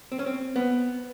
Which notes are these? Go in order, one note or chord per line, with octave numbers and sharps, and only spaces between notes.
C4
C#4
C4
B3